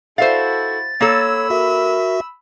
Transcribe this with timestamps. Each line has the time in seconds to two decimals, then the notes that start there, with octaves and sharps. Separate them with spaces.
0.18 E4 F#4 A4 C5 E5 F5 A6
1.01 A#3 A4 C#5 B5 E6
1.50 F#4 A#4 E5